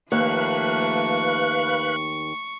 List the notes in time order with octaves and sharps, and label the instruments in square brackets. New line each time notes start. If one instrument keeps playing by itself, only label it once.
[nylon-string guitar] D#2 [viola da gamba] F3 A3 A#3 [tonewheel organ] B4 F5 F#6 [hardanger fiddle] C#6